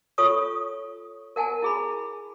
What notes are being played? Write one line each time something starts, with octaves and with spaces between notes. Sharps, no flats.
F4 A4 C#5 C#6 D#6
A#4 F#5 G#5 A5
E4 G#4 B5